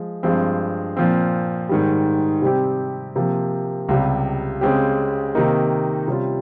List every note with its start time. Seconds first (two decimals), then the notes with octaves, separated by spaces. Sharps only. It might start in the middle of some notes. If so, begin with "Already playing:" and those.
Already playing: F3 G#3
0.23 G2 F3 G#3 C4
0.97 A#2 F3 C4
1.69 G#2 D#3 G3
2.42 C3 G3 C4 G4
3.16 C3 F3 A#3
3.89 C#2 C3 G3
4.61 C#3 G#3 C4 G4
5.35 C3 D#3 A#3 D#4
6.08 C3 G3 C#4 F4